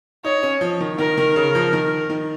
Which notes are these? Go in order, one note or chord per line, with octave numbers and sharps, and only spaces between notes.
D#4 C#5
C#4
F3
D#3
D#3 A#4
D#3
C#3
F3
D#3
D#3